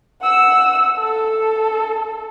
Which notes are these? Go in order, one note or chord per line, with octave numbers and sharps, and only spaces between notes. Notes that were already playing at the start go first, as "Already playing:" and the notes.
F#5 E6
A4